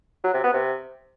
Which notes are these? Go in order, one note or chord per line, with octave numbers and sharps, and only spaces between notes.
F#3
C3
B3
C3